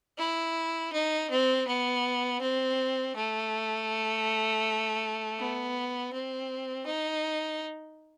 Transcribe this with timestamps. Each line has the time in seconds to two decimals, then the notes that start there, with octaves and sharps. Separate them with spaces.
0.18 E4
0.92 D#4
1.30 C4
1.67 B3
2.41 C4
3.15 A3
5.39 B3
6.13 C4
6.86 D#4